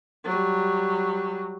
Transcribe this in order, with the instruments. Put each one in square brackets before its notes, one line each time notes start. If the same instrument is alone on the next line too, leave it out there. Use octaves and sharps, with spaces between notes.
[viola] F#3 G3